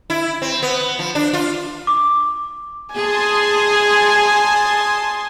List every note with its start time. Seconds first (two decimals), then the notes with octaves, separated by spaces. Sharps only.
0.10 E4
0.42 C4
0.63 B3
0.99 F3
1.15 D4
1.33 F4
1.87 D6
2.95 G#4 G#5 A5 C6 D#6